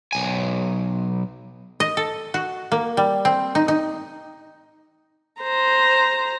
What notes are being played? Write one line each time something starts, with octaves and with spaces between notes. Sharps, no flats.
B1 G#5
D#5
A4
F#4
A#3
G3
C4
D#4
D#4
C5 A#5